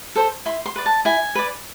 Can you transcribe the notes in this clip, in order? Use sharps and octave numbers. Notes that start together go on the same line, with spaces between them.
A4 C5
E4 C6
C6
B4 D5
A5
E4 G#5
B4 D5